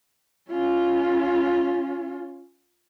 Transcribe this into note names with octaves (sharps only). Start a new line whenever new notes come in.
C#4 F4